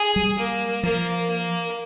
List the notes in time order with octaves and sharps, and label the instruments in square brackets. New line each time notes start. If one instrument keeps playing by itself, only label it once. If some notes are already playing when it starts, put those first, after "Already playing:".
Already playing: [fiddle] G#4
[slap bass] G3
[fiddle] A#3
[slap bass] F3 [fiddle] A#3
[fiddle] A#3